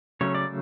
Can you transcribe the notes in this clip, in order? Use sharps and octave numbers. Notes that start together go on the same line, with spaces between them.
C#3 F#3 A3 C#4 C#5
D5